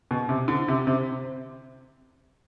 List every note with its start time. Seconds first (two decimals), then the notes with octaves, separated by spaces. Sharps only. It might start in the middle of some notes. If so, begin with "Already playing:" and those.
0.11 B2
0.29 C3
0.48 D3
0.68 C3
0.87 C3